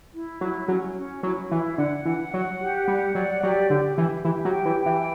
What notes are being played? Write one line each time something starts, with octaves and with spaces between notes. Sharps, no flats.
E4
F#3 E4
F#3 C#4
C#4
F#3 E4
E3 E4
D3 F#5
E3 F#5
F#3 F#5
G4
G3 F#5
F#3 D5
F#3 G4
D3 G4
E3 G4
E3 G4
F#3
G5
E3
G5
E3